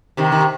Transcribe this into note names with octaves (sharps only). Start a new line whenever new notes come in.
C3 D#3
D#3